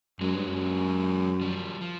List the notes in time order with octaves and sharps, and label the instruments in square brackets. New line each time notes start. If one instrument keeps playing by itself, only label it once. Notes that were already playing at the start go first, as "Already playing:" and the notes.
[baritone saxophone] F#2 [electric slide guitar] F#3 G#3
[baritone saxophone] G2
F#2
[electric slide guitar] F3 G3
F3